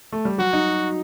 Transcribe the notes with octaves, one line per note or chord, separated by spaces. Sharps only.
A3
G3
F#3 F#4
D#4